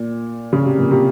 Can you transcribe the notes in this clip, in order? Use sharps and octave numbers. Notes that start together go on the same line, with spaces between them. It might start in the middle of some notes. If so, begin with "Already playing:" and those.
Already playing: A#2
C#3
C3
A#2
C3